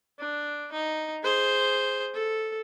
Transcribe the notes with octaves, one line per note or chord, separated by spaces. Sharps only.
D4
D#4
G#4 C5
A4